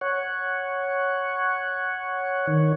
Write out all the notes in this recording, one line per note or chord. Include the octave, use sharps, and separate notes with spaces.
C#5 F#5
D#3 C#5